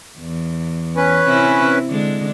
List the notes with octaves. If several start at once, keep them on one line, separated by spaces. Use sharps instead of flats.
E2
C#4 B4
C3 C4 E4
D3 G#3 D4